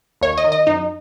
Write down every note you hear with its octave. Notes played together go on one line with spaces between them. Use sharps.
D#2 C#5
D#5
D#3
D#5
F#2 D#4